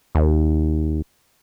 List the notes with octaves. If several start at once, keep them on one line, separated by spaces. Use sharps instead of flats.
D#2